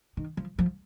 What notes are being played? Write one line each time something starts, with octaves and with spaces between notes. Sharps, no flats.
D#3
F3
F3